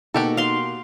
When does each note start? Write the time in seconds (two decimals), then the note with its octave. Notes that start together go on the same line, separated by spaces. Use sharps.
0.14 B2 A#3 D#4 F#4 G4 A4
0.37 F5 C6